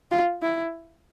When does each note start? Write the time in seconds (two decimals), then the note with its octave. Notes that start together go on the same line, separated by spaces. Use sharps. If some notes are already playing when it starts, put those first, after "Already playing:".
0.11 F4
0.42 E4